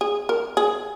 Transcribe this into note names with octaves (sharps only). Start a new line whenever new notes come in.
G#4
A#4
G#4